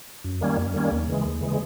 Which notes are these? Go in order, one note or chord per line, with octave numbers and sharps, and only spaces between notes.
F#2
D#3 G3 A#3 C#4
F#2
D#3 G3 A#3 C#4
D#2
C#3 E3 G#3
D#2
C#3 E3 G#3